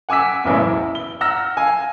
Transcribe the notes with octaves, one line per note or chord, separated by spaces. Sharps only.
F#5 G#5 D6 E6 B6
F#1 B1 E2 A2
E4
G7
F#5 A#5 E6 F6 A#6
F5 G#5